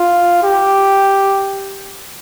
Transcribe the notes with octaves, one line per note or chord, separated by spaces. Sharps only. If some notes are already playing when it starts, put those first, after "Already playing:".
Already playing: F4
G4